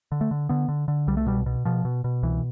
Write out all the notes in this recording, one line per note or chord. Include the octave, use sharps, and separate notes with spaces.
D3
A3
D3
D3 B3
D3
D3
C2 G3
A3
B2 G3
B2
B2 F3
B2
B2
C2 E3